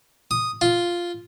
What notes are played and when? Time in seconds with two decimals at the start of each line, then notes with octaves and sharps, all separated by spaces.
0.31 D#6
0.61 F4